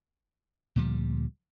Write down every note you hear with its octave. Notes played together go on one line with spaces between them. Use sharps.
D2 A#2 F3 G3